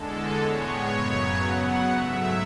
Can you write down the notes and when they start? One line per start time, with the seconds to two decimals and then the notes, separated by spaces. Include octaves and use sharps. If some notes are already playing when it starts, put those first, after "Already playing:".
Already playing: E2 D3 G#3 A4
0.37 A2 G#3 B3 C#5
0.87 F#2 C#3 F#3 B3
1.37 C#3 F#3 B3 F#5
1.88 G#2 F#3 A3 E5